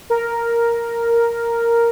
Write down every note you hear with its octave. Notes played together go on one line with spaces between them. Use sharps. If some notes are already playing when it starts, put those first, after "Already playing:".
A#4